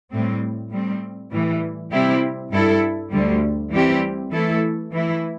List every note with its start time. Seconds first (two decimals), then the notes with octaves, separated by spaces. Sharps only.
0.11 A2 G3 C4
0.71 A2 G3 C4
1.32 A2 E3 G3
1.92 C3 G3 C4 E4 G4
2.51 G2 G3 E4 A4
3.11 D2 D3 G3
3.71 E3 G3 C4 E4 G4
4.32 E3 A3 E4 A4
4.91 E3 A3 E4